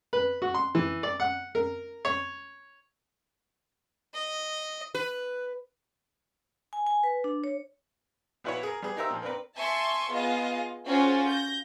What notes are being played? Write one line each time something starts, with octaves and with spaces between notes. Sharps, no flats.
B4
F#4
C6
E3
D5
F#5
A#4
C#5
D#5
B4
G#5
G#5
B4
D4
C#5
A#1 B3 E4 F#4 B4 C#5
G#4 A#4
G3 B3 G#4
D#4 G4 A#4 C5 E5
A#2 F3
B3 C4 D4 A#4 B4
E5 G#5 A5 C6 C#6
B3 F4 G#4 D#5 F5
C#4 F4 F#4 G#4 C5
G6 A#6